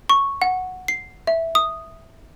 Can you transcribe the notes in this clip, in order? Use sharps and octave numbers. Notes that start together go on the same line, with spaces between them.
C#6
F#5
C7
E5
D#6